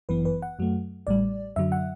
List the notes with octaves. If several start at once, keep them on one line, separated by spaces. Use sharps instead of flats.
G1 F#2 E3 B3 B4
B4
F#5
F#2 F#3 A3
A1 A2 G3 D5
F#2 D3 F#3 E5
F#5